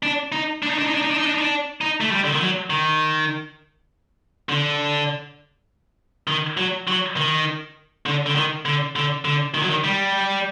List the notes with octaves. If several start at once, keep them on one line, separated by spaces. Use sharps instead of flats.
D4
D#4
D4
D#4
D4
D#4
D4
D#4
D4
D#4
D4
D#4
D4
D#4
A3
G3
D3
D#3
F#3
D#3
D3
D#3
F#3
F#3
D#3
D3
D3
D#3
D3
D3
D3
D#3
F#3
D#3
G3